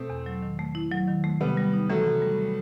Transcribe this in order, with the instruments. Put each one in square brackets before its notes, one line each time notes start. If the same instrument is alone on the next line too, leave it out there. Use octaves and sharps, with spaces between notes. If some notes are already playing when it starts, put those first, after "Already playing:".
Already playing: [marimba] B2 [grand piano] A3 C4
[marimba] E2
F#3
D#3
A3
E4
F#3
D#3
A3
[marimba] C3 [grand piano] G3 B3
[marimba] G3
D#4
[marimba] E3 [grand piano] F#3 A3
[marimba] C3
G3